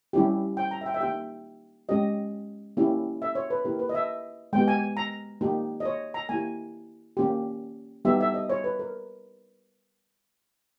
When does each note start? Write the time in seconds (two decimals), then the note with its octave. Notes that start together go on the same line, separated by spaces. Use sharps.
0.13 G3 C#4 E4 G4
0.57 G5
0.71 A#5
0.81 E5
0.86 G5
0.94 E5
1.00 A#3 D#4 G4 G5
1.89 G#3 C#4 G4 D#5
2.77 A#3 C#4 E4 G4
3.22 E5
3.35 C#5
3.50 B4
3.65 A#3 E4 G4 A#4
3.79 B4
3.89 D#5
3.95 E5
4.53 G#3 G5
4.55 B3 G4
4.68 G#5
4.97 A#5
5.41 A#3 D#4 G4
5.80 D#5
5.85 C#5
6.14 A#5
6.29 A#3 E4 G4 G#5
7.17 A#3 C#4 G4
8.05 G3 B3 D#4 G4 E5
8.21 E5
8.34 D#5
8.49 C#5
8.64 B4
8.79 A#4